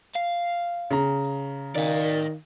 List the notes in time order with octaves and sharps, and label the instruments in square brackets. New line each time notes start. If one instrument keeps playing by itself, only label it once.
[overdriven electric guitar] F5
[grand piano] C#3 A#5
[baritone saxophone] D#3 [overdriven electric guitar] D5 F5